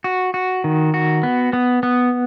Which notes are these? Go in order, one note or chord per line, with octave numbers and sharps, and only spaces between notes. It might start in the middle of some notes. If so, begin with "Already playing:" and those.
F#4
F#4
D#3
F#4
B3
B3
B3